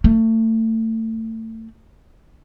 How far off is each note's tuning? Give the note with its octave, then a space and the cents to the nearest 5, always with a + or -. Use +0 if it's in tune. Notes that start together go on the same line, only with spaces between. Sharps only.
A3 +30